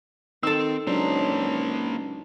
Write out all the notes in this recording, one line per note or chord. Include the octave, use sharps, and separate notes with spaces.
D#3 C4 A4 E6
C#2 F#3 A#3 D4 D#4 C5